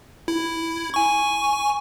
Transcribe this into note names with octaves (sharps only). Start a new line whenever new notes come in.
E4
G#5 C#6